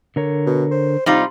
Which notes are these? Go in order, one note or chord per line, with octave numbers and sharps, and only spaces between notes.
D3 A#4 C#5
B2
C5
C3 G3 D#4 F4